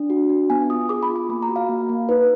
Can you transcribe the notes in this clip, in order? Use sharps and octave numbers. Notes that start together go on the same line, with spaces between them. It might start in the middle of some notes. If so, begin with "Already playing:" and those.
Already playing: D4
F#4
D4
B3 G#5
F4 D#6
G#4 D6
B5
F4
D6
A#3 B5
A#5
F#4
F5
A#3
A#3
D#4 B4